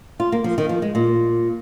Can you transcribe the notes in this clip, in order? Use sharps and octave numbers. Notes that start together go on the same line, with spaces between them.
F4
A#3
F3
D#3
F3
G#3
A#2